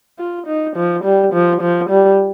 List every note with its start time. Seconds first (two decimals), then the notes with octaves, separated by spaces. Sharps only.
0.19 F4
0.47 D#4
0.76 F3
1.04 G3
1.33 F3
1.61 F3
1.90 G3